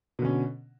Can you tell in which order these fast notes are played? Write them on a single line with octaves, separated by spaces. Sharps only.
B2 D3 C#4